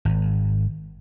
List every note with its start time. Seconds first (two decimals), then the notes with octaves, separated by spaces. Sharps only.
0.05 G#1